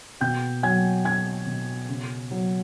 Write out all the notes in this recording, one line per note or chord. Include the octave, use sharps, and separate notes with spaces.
B2 G5 G6
F#3 G#5 G#6
F#3 G#5 G#6
B2
C#3
F#3